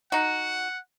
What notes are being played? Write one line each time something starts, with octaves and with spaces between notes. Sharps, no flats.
D#4 F#4 F#5